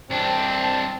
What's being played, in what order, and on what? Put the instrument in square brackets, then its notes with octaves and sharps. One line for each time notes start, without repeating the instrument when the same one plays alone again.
[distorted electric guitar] C2 D4 [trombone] C4 [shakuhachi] A5